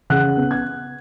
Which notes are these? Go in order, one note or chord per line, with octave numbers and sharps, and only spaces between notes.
C#3 F#5 F#6
B3
G#6